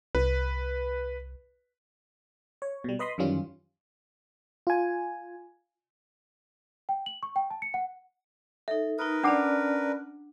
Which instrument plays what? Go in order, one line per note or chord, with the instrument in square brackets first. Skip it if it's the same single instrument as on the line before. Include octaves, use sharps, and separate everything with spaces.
[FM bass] C2 [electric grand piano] B4
[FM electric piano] C#5
B2 G3
B4 D#5 B5 C6 D#6
F#2 D#3 E3 G3 C#4 F4
F4 G#5
[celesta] G5
F#7
C#6
G5
A5
C#7
F#5
[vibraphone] D#4 A4 [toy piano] E5
[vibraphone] D#4 D#6 [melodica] A#4 B4
[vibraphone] C#4 D5 A5 [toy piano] D4 F#5 D6